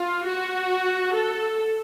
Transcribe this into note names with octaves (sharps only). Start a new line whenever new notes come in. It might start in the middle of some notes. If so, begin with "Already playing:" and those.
Already playing: F4
F#4
A4